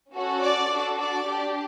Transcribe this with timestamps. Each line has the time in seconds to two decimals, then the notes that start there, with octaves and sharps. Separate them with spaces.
0.14 C#4 F#4 A4
0.42 D5
0.71 D4 F#4 A4
0.99 D5
1.28 D4 G4